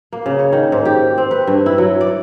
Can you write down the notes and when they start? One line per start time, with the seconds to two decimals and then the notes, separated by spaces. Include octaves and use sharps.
0.13 A#3
0.26 C#3
0.39 C#5
0.52 D#3
0.72 G#2
0.85 G4
1.18 C4
1.31 B4
1.47 G2
1.66 E4
1.78 F#3
2.01 D5